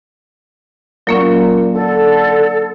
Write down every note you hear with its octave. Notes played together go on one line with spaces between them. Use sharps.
A#2 F#3 A#3 C#4
D3 A4